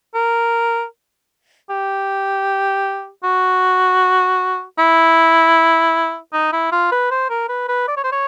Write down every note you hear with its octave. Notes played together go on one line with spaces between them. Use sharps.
A#4
G4
F#4
E4
D#4
E4
F4
B4
C5
A#4
B4
B4
D5
C#5
C5
C#5